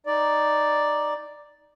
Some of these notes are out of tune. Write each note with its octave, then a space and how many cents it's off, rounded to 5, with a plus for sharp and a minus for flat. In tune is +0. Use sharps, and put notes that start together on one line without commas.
D#4 +0 D5 +0